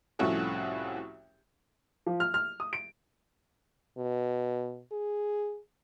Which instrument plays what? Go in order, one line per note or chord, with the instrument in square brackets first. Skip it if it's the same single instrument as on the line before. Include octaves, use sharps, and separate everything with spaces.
[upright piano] C2 A2 F3 C#4 F#4 A4
F3
F6
F6
D#6
D7
[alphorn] B2
G#4